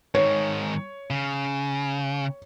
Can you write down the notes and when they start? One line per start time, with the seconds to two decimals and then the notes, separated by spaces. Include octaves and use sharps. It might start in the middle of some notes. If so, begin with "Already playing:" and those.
0.15 G#2 D#3 C#5
1.10 C#3